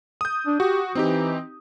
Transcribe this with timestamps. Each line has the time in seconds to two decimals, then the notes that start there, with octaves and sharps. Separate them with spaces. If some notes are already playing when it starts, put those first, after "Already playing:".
0.21 D#6 G6
0.47 D4
0.60 F#4 G4
0.95 E3 C4 D#4 G4